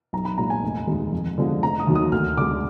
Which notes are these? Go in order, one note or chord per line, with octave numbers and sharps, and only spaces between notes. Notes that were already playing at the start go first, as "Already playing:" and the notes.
B1 A#5
B5
A#2 G#3 A#5
G#5
F1
D#2 D#3 G#3
F2
D3 F3 G#3
F1 A#5
D#6
D#2 D#3 F#3
D#6
D2 F6
D3 G#3 D6